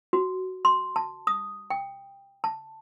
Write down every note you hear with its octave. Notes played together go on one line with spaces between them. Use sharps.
F#4
C6
A5
D#6
G5
A5